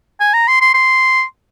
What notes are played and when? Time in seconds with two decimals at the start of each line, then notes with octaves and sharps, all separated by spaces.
0.20 G#5
0.34 A#5
0.48 C6
0.61 C6
0.74 C6